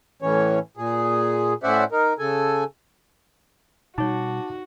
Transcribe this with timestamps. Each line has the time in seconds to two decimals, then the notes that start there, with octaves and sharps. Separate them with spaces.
0.22 A2 E3 C#4 C#5
0.77 A#2 G#4
1.63 A2 C#4 C5 D5 E5 F#5
1.92 D#4 A#4
2.19 C#3 A4 G#5
3.98 B2 G3 D#4 F#4 C#5 A5 D6